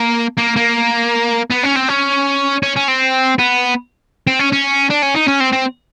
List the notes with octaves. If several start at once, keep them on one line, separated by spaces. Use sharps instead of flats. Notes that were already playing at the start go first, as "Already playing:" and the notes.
Already playing: A#3
A#3
A#3
B3
C#4
C4
C#4
C#4
C#4
C4
B3
C4
C#4
C#4
D4
C#4
D#4
C#4
C4
C4